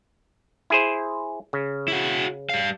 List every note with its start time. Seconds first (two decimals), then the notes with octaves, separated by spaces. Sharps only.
0.70 E4 G#4 C5
1.53 C#3
1.88 E4 F#4
2.49 G3 F5